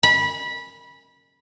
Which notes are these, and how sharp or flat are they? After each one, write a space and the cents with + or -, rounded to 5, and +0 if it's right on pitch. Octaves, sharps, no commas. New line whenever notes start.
B5 -20